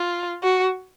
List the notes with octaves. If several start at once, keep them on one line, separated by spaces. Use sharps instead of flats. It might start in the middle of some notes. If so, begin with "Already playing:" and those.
Already playing: F4
F#4